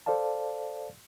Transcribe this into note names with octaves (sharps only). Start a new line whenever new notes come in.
A4 C5 D5 F5 A5